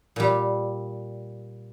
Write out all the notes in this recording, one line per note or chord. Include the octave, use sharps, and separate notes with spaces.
A#2 G3